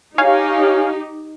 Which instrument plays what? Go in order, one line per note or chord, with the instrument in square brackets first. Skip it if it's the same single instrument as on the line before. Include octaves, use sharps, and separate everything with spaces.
[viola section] D#4 G4 [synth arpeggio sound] C#5 F5 G#5